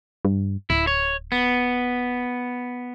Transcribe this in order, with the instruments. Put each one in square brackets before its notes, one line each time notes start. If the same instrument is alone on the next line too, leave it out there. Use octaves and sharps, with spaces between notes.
[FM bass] G2
[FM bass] D1 [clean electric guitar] E4
[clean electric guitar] C#5
B3